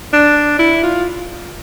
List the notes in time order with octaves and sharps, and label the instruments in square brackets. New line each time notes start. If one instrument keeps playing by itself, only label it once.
[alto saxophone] D4
E4
F4